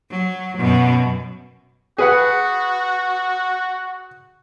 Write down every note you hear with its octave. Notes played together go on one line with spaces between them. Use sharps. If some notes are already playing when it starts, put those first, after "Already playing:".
F#3
F#2 B2
F#4 G#4 B4 F#5